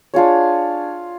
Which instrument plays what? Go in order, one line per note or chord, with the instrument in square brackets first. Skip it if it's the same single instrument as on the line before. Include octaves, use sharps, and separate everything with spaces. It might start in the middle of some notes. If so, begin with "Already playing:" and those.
[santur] D4 F4 G#4 C#5